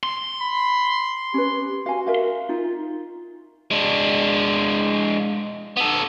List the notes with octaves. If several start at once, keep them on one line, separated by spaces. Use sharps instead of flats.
C6
B5
C#4 G4 B4
F#4 F5 G#5
A#4 E5 F5
D#4 F4
G#3 D4
B3 A4